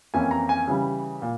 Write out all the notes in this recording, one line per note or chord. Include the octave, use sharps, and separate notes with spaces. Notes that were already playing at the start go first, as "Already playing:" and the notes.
F2 E3 A#3 C#4 G#5
A#5
G#5
C#3 E3 G3
A#2